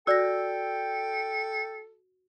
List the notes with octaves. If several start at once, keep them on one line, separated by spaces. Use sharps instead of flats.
F#4 A4 D5 G5 E6 A#6